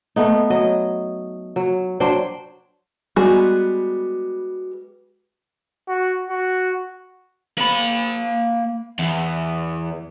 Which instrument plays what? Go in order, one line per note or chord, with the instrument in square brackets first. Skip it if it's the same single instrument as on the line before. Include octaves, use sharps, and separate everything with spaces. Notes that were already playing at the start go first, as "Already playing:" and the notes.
[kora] A3 B3 D#4
F#3 D#5
F#3
F#3 D4 C5 G5
[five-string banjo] G3 G#3 B3 F#4 G#4
[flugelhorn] F#4
F#4
[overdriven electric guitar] A#3 B5
E2